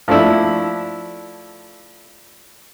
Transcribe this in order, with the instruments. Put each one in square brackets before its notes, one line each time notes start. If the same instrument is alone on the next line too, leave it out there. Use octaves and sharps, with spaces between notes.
[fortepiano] F3 A3 D4 E4